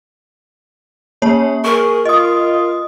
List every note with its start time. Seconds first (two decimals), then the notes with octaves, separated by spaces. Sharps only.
1.22 A#3 C#4 C#5
1.64 G#4 A#4 C#6
2.05 F4 D#5 D#6